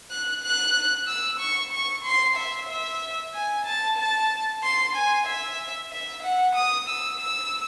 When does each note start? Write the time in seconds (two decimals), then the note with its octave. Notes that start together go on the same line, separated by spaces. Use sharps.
0.11 F#6
0.43 F#6
1.07 E6
1.40 C#6
1.73 C#6
2.04 C6
2.37 E5
2.69 E5
3.34 G#5
3.65 A5
3.98 A5
4.63 C6
4.95 G#5
5.27 E5
5.92 E5
6.23 F#5
6.55 D#6
6.89 E6
7.20 E6